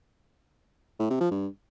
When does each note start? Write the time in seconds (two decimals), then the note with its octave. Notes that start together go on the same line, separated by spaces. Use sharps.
1.00 A2
1.10 C3
1.21 F3
1.31 G2